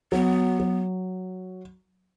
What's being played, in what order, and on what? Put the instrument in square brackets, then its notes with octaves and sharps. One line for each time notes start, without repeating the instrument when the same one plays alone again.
[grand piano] F#3 [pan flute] B3
[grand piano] F#3